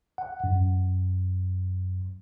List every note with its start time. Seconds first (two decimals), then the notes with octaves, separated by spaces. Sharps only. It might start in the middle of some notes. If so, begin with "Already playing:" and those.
0.18 F#5
0.44 F#2